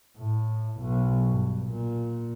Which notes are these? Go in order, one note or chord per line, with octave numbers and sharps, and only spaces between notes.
A2
B1
G2
A#2